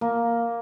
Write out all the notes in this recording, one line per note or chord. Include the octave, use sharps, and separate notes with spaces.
A#3